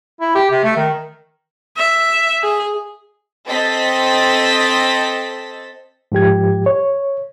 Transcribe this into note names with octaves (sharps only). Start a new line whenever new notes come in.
E4
G4
C3
A3
D#3
E5
G#4
C4 A4 D#5 A6 B6
G#2 F3 G4 G#6
C#5